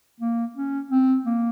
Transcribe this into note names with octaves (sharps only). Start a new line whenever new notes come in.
A#3
C#4
C4
A#3